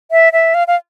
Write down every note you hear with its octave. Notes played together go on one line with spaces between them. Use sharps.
E5
E5
F5
F5